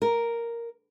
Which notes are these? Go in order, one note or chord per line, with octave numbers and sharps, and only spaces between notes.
A#4